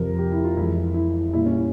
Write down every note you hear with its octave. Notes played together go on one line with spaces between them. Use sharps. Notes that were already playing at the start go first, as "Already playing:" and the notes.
Already playing: F2 C3 F3 A#4
G4
E4
F4
F2 E3 G#3 E4
E4
A#2 G3 E4
C#4